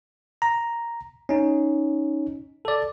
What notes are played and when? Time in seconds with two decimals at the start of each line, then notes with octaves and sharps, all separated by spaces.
0.42 A#5
1.29 C#4 D#4
2.65 A4 D5